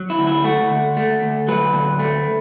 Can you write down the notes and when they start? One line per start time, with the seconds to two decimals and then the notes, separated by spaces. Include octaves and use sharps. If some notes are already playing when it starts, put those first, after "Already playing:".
Already playing: F#3
0.10 E4
0.19 D2
0.27 E4
0.44 A3 F#4
0.70 D2
0.96 A3
1.22 D2
1.48 F#3 B4
1.74 D2
1.99 A3